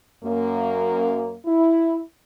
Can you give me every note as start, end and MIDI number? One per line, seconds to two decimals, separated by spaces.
0.24 1.34 42
0.24 1.34 58
1.46 2.01 64